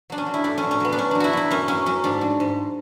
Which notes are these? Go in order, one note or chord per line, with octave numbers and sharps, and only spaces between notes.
F#3 D4
C#4
F#3
E4
A2 D4
C#4
F#3
C#4
F#3 B3
D4
F#3 C#4
F#3 D4
E4 F#4
F#3 E4
F#2 C#4
F#3 C#4
F#3 C#4
G#2 D4
F#3
G#2